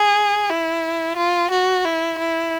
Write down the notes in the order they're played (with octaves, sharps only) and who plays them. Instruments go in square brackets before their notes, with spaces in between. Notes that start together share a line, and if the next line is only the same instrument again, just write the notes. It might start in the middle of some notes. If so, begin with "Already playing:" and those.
Already playing: [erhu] G#4
E4
F4
F#4
E4
E4